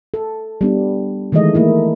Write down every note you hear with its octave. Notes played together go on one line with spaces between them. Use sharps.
A4
G3 B3 D4
D#3 E3 G#3 A3 D#5
A3 A#3 E4